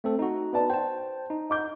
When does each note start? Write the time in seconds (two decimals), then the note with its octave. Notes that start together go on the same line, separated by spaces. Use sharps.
0.04 A3 C4 A4
0.19 D#4 F#4
0.53 B3 D5 A5
0.70 C5 G5 A5
1.30 D#4
1.50 D#5 D6 G6